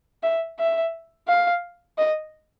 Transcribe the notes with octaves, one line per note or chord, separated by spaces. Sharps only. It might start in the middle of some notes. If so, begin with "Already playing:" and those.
E5
E5
F5
D#5